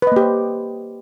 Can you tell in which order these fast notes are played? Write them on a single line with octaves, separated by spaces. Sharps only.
B4 D#5 A#3 G4 C5